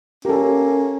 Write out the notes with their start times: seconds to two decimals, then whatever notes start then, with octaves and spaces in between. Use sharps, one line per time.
0.25 A#3 C#4 G4 A4